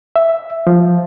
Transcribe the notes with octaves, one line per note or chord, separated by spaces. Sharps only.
E5
F3